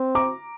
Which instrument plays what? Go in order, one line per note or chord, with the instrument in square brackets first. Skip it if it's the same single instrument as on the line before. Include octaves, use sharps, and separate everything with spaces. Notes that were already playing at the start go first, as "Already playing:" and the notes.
Already playing: [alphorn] C4
[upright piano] A#5 D6